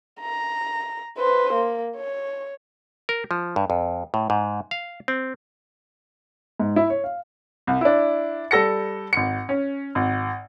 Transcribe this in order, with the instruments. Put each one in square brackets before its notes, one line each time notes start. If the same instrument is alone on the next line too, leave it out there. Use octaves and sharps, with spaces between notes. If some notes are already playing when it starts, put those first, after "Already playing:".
[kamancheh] A#5
B4 C5
A#3
C#5
[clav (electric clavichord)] A#4
F3
G2
F2
A2
G#2
F5
C4
[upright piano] G#2
E4
C#5
F5
[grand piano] C2
D4 E4
G3 A4 A#6 C#7
G#1 C#7
C#4
G#1